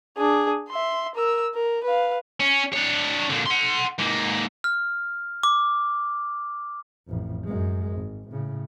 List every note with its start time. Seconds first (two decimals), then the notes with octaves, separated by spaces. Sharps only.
0.18 D4 G#4
0.69 E5 C6
1.15 A#4 E6
1.54 A#4
1.84 B4 F5
2.40 C#4
2.74 D4 C#5
3.30 A#2 D3
3.46 F#5 C6
3.99 G#2 A#3
4.64 F6
5.43 D6
7.07 A1 F2
7.44 F#2 G#3
7.97 G#1
8.29 A2 C#3